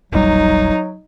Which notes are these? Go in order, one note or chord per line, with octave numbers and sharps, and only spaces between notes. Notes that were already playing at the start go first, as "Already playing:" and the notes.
E1 A#1 F#3 G3 D#4